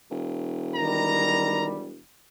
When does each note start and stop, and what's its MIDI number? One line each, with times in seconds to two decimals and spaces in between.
0.10 1.98 28
0.76 1.76 51
0.76 1.92 55
0.76 1.68 82